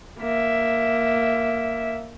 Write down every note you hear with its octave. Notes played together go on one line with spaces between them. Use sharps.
A#3 E5